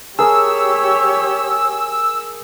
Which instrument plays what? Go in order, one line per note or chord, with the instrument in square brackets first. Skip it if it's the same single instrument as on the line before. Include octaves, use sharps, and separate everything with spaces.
[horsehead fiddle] G4 C#5 [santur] G#4 [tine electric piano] A#4 A5 [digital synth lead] E6